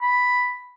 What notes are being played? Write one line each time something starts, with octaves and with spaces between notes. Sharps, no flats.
B5